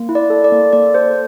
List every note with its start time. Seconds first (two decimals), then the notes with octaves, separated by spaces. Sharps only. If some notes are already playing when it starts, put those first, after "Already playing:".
Already playing: A#3
0.09 E4
0.15 D5
0.30 A4
0.44 D5
0.52 A#3
0.73 A#3 D5
0.94 A4 C5